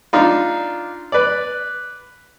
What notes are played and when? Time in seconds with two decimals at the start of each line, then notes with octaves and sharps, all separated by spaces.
0.13 D4 D#4 F4
1.12 B4 D5